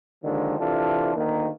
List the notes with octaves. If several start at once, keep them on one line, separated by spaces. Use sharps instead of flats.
D#2 D3 D#3 F3 G#3
C3 E3 D4 F4 A4
D2 D#3 A#3